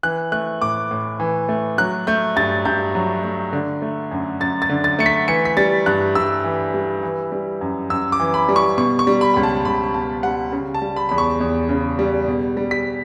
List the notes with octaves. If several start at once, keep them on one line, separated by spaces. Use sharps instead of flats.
E3 F#6
A3 F#6
A2 D6
A2
E3
A3
F#3 F#6
A3 G6
G2 A6
G2 G6
F#3
A3
D3
A3
F#2
F#2 A6
A6
D3
A6
A3 C#7
B6
E3 C#7
B6
G3 A6
G2 F#6
G2 E6
E3
G3
E3
G3
F#2
F#2 E6
D6
E3
B5
G3
C#6
B2 C#6
C#6
G3
B5
C#2 B5
A5
C#2 B5
B2 A5
G3 F#5
C#3
A5
G3
B5
E2 B5
C#6
E2
C#3
G3
B2
G3
B6